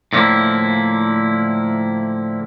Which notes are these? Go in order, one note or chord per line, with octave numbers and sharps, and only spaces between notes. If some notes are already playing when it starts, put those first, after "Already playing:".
A2 D3 F3 G3 A#3 E4